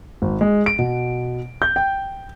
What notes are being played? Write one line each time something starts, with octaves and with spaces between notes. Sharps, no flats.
G#1
G#3
D7
B2
G6
G5